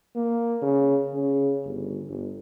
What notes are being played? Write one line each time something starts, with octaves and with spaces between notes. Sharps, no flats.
A#3
C#3
C#3
G1
G1